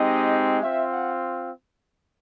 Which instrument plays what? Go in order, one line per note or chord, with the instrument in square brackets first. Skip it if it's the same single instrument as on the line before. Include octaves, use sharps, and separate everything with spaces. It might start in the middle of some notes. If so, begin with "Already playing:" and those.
Already playing: [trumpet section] G#3 C4 D#4 G4 D#5
C4 F4 E5
F#5